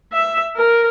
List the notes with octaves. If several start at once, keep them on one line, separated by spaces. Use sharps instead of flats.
E5
A#4